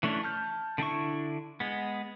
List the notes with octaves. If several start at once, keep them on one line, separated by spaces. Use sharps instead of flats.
E3 A3 C#4 D4
A5 F6 G6
D3 D4 E4 C#6
G#3 B3